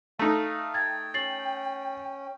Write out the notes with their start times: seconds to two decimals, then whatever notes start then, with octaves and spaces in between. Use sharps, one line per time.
0.19 A3 D#4 F5
0.74 G5 G#6 A6
1.14 C#4 A6 C7 F#7